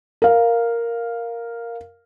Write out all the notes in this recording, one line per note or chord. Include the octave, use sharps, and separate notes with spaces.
A#4 F5